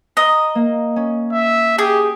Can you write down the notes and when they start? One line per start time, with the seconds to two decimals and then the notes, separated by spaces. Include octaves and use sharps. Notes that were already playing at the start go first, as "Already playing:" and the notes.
0.17 D#5 A#5
0.55 A#3
0.96 C#4
1.32 E5
1.78 G4 G#4